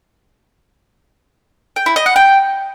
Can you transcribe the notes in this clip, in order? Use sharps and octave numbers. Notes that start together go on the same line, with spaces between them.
G5
E4
D#5
F#5
G5